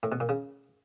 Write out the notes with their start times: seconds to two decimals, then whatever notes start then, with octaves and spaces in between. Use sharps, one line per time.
0.03 A2
0.12 B2
0.20 A#2
0.29 C#3